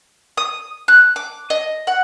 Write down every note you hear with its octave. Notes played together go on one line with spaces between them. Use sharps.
D#6
F#6
D6
D#5
F#5